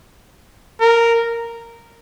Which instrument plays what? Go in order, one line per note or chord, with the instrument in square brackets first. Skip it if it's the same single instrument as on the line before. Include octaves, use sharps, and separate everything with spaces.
[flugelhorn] A#4